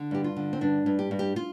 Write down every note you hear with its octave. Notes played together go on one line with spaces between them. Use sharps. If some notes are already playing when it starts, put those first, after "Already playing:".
Already playing: D3
G2 G4
F4
D3
C4
G2 D4
G2
G4
G2
G4
F4